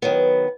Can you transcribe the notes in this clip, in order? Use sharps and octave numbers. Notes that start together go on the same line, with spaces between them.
D#3 F#3 B3